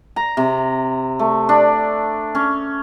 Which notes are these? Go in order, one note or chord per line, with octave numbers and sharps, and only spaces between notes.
A#5
C3
A3
D4
C#4